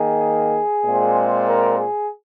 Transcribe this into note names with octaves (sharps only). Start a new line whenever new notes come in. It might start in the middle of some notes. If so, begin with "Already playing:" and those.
Already playing: D#3 A#3 G#4
A#2 G#3 C4
A#4
G#4